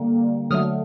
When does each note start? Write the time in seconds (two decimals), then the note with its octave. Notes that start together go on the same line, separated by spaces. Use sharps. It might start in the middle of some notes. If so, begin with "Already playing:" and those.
Already playing: D3 G3 A#3
0.50 D3 F#3 A3 D#6 F6